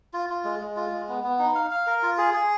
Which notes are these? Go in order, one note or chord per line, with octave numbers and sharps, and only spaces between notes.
F4
F4
G#3
G#3
F4
G#3
B3
B3
D#4
F5
F5
A#4
F4
G#4
G#4